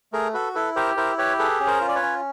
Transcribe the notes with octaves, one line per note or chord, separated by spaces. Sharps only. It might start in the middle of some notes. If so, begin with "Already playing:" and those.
A3 G#4 A#4
F#4 A4 B4
E4 A4 B4
G4 A#4 C5
E4 A#4 C5
G4 B4 C#5
G#4 A4 B4
C#4
A#4 C5
F4
D5
B4 C#5
C#4